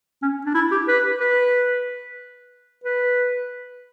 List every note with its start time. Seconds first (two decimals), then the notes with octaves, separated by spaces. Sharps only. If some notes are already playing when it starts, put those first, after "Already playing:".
0.22 C#4
0.46 D4
0.55 E4
0.72 G4
0.88 B4
1.20 B4
2.84 B4